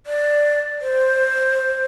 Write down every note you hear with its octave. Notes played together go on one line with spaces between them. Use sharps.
D5
C5